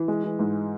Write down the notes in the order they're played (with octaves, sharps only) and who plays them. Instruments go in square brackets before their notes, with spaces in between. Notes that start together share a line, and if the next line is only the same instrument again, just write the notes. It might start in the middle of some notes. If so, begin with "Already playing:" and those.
Already playing: [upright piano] E3
G#3
E3
G#2